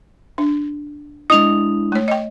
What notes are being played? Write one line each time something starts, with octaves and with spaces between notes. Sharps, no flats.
D4
G#3 D4 E4 D#5 D#6 F7
A3 C#5
D#5 G5